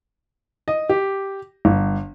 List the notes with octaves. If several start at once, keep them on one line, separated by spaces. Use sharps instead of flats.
D#5
G4
G1